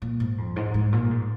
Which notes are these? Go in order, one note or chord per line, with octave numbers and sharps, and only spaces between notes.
A#2
G#2
F2
G#2
G#2
A#2
G#2